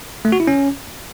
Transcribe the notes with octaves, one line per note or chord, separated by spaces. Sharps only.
A3
F#4
E4
C#4